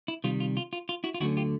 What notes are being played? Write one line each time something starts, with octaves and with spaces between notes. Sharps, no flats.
E4
C3 D#3 G3 F4
F4
F4
F4
F4
E4 F#4
F4
D2 D3 F#3 A3 C#4 E4 F#4
F4 G4